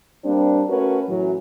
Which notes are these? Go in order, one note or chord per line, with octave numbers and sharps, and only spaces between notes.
G3 A#3 C4 D4
A3 C#4 F#4 A#4 B4 C#5
F#2 A2 E3 F#3